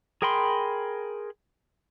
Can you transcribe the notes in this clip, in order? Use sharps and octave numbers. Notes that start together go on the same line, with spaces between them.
G#4 A#4 G5 B5 C6